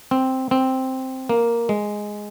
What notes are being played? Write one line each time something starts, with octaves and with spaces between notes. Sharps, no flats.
C4
C4
A#3
G#3